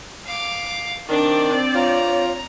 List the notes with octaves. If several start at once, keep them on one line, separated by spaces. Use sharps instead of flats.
F5 D6
D#3 C4 D4 D5
F4 C#5 A#5